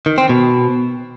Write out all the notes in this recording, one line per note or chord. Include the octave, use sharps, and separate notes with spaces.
D#3
C4
B2